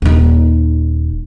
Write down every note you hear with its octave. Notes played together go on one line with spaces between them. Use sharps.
D#1 D#4